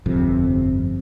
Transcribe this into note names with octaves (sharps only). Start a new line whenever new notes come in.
G1 F2 C3